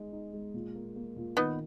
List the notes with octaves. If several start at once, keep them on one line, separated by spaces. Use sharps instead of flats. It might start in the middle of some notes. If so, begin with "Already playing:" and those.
Already playing: G#3 D#4
D#4
G#3
A#2
A#3
A#3
A#2
D#3 B3 D#4